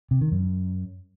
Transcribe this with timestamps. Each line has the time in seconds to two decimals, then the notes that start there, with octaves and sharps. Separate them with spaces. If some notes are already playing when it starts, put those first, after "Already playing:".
0.11 C3
0.21 D#3
0.32 F#2